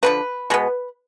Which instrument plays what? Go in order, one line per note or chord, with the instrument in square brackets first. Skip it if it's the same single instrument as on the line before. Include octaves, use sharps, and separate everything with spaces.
[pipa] D3 F3 A#3 B4
B2 G#3 B3